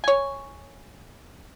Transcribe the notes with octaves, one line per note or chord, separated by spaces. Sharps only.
C#5 G#5